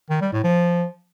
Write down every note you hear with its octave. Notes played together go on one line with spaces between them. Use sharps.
D#3
G3
A2
F3